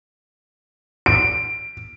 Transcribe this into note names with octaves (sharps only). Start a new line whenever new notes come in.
D7